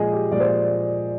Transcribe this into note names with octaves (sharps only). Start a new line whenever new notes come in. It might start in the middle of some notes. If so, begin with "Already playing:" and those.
Already playing: A#2 F3 G#3 G#4 D#5
G4
A#2 F3 G#3 D5
C5
D5